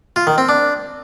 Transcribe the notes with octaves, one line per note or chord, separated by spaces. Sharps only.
F4
D#3
C4
D4